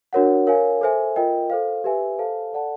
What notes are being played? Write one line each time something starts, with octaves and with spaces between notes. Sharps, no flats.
D4 F#4 A#4 C#5 F#5
A#4 C#5 F5 G#5
A4 C5 E5 G#5
F4 A#4 D#5 G5
A4 C5 F5
G4 B4 E5 G#5
A4 C5 F5 A5
A4 D5 F#5 A5